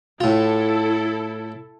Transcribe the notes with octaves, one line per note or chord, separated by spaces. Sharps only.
A2 E4 F4 A4